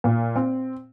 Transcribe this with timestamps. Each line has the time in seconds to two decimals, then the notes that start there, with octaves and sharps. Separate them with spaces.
0.04 A#2
0.36 C4